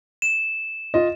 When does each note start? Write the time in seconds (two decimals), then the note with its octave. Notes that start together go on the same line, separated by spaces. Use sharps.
0.22 E7
0.94 F4 D#5